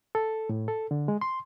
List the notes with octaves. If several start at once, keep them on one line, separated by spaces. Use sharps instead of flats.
A4
A2
A4
D3
G#3
C6